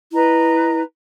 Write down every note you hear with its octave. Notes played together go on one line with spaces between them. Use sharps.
E4 B4 D#5 A#5